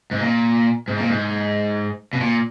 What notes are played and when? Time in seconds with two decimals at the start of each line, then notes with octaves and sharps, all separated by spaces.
0.11 G#2
0.20 A#2
0.88 G#2
0.97 A#2
1.09 G#2
2.13 B2
2.21 A#2